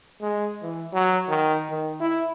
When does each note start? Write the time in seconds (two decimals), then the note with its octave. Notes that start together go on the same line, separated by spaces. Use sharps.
0.21 G#3
0.62 E3
0.93 F#3
1.28 D#3
1.70 D#3
2.00 E4